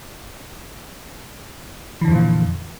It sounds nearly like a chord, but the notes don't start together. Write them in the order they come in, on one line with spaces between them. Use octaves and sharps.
E3 D3 F2 F3 A#2